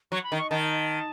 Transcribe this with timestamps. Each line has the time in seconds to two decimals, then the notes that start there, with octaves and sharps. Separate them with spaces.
0.12 F#3 C#6
0.24 B5
0.32 D#3
0.37 C#6
0.50 D#3 A5